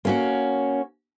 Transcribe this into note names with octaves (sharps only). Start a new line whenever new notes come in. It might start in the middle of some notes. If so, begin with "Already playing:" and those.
A#3 C#4 F#4